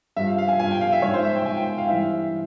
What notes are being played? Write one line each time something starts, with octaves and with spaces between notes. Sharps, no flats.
G2 F3 E5
F5
F5
G#5
G2 F3 G#5
G5
F5
E5
G#2 F3 C#5
C5
E5
G5
G#2 F3 G#5
G5
G5
F5
G2 E3 E5